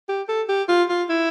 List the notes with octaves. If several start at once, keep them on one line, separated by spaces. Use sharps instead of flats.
G4
A4
G4
F4
F4
E4